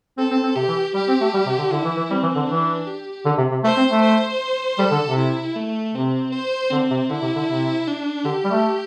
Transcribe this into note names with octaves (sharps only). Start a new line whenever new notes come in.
C4 A4
C4
C4
C3 G4
E3
G3 G4
C4
A3
G3
C3
D3
D3 E4
E3
E3
G3 C4
E3
D3
E3 D4
G4
D3
C3
C3
A3 C5
C4
A3
C5
G3 A4
D3
C3
E4
A3
C3 C4
C5
D3 C4
C3
D3 E4
C3
D3
C3
D4
D3 G4
G3
A3